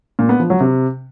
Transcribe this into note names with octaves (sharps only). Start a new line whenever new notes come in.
A#2
B3
F3
F#3
C3